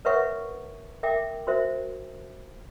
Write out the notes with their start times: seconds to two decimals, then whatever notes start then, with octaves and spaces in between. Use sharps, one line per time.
0.05 A#4 B4 C#5 E5 F#5 C#6
1.03 A#4 E5 G5 D6
1.47 F#4 A#4 C5 E5